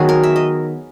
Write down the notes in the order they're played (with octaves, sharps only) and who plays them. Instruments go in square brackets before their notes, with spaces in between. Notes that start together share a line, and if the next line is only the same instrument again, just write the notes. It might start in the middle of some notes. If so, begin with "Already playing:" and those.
Already playing: [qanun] D#3 F#3 B3 F#4 G#4
A#4
E5
D#5